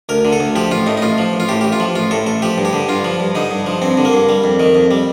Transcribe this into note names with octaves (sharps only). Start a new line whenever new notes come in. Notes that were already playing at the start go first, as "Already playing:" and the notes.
D2 A#4
D3
A4
D2
F3 G4
A1 F4
A2 D#4
D#4
A1 F4
F3
A1
F4
A2 G4
A1 G4
F4
F3
A1 F4
A2 A4
A1 A4
F3 G4
G2
G4
D3
G2 F4
F3
G2
D3 D#4
G2
F3
G2 C4
D3
A#3
G2
G3
F2
D#3
F2
G3